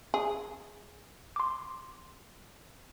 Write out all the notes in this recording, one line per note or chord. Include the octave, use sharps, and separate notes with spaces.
G#4
C6 D6